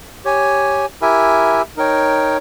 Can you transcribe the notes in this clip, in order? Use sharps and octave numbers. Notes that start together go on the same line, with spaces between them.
G4 C#5 G#5
E4 G4 A#4 E5 G#5
D#4 A#4 C#5 G5